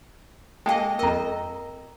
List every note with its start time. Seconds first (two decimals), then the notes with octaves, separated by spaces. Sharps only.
0.66 G#3 A#3 A4 D#5 G5 A5
0.99 F2 A#4 D#5 A#5